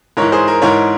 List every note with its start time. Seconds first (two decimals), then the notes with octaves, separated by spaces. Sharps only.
0.17 G#2 E3 A#4 C#5
0.32 G#4 C5
0.48 A#4
0.62 G#2 E3 A#4 C#5